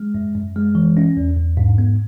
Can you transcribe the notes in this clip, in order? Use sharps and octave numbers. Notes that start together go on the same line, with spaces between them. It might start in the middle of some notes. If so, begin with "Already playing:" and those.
Already playing: G#3
F#2
F#2
G#3
E3
C#4
E2
E2
G#2
B3